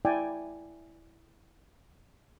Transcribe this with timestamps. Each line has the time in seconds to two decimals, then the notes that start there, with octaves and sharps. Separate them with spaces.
0.05 E4 D5 G5 G#5